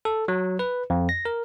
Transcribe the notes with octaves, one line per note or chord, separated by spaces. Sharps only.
A4
F#3
B4
F2
A#6
A#4